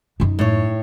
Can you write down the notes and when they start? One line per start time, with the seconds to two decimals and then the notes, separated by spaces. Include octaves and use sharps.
0.20 F#2 D#4
0.39 A2 C#5